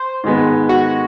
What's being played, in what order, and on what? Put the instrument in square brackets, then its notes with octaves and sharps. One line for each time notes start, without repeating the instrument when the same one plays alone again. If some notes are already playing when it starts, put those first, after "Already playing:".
Already playing: [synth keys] C5
[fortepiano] G#2 D#3 G#3 B3
[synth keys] F#4